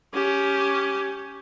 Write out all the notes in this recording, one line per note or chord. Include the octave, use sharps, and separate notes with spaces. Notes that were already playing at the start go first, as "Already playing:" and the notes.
C#4 G4